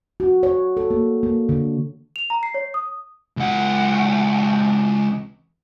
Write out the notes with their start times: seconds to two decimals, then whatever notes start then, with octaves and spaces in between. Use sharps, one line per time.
0.20 F#4
0.43 C#5
0.77 A4
0.90 A#3
1.23 A#3
1.49 D3
2.16 F7
2.30 A#5
2.43 C7
2.54 C#5
2.74 D#6
3.37 C#2 F#5